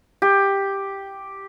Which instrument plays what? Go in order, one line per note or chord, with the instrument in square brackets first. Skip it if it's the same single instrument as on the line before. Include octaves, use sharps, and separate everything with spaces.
[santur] G4